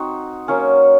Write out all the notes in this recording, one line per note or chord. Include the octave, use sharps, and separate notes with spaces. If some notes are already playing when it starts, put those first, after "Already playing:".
Already playing: C4 D#4 F#4
F#3 A#3 C#4